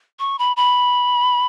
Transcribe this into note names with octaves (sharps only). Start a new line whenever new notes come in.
C#6
B5
B5